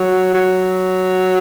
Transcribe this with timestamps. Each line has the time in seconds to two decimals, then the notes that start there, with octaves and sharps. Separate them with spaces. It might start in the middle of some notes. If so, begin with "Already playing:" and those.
Already playing: F#3
0.34 F#3